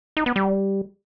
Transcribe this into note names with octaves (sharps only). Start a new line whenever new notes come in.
D#4
B3
G3